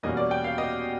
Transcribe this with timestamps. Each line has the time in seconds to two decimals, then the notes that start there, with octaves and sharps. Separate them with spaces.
0.03 E2 B2 G3 A#3 C#4 D#5
0.17 D5
0.31 G5
0.44 F5
0.58 D#5